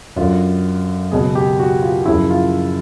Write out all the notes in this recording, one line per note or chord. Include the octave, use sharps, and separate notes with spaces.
F#2 D3 F#3 F4
C#2 B2 F#3 G#4
G4
F#4
F4
F#2 C#3 F3 E4
F4